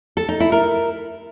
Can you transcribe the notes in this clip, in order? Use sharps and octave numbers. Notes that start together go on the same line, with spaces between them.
A4
D#4
E4
A#4